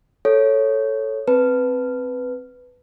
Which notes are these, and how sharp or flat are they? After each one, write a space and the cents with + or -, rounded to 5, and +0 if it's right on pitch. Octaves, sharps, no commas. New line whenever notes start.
A4 +0 C#5 +0
C4 +5 B4 +5 A5 +0